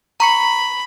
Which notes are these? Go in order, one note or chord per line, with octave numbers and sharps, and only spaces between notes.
A#5 B5 C#6 C#7